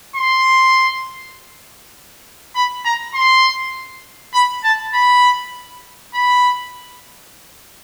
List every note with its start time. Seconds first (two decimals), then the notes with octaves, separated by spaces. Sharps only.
0.16 C6
2.55 B5
2.85 A#5
3.14 C6
4.34 B5
4.64 A5
4.94 B5
6.14 B5